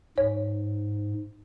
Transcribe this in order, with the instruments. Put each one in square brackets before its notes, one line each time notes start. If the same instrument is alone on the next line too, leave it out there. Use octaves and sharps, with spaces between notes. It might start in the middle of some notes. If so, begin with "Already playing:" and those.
[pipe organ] G#2 [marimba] C#5